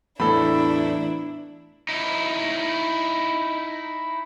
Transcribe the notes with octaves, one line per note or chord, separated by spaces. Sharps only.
E2 A2 D4 E4 A4 B5
D#4 E4